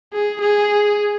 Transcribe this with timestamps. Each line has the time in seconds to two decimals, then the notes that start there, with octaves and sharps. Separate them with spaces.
0.13 G#4
0.41 G#4